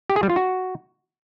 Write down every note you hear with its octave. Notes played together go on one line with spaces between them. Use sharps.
G4
G#4
G3
F4
F#4